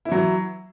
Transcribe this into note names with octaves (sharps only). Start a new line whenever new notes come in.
E3 F#3 E4